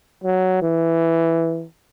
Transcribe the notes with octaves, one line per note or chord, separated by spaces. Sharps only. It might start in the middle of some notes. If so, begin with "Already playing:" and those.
F#3
E3